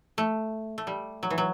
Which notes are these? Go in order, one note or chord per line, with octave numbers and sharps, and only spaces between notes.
A3
A3
G3
F#3
E3
F#3